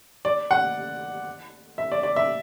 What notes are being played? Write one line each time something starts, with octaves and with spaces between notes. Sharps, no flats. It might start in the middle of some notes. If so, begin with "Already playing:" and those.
D5
F#5
E5
D5
D5
E5